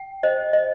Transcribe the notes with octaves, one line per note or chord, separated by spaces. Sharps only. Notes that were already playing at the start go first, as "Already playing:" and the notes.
Already playing: G5
C5 D#5
D#5